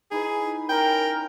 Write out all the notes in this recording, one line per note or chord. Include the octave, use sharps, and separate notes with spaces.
D#4 E4 G#4 B4
C#4 A#4 G5 C6